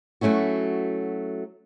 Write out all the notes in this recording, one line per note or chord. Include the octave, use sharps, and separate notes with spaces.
F#3 A3 C#4 E4 F#4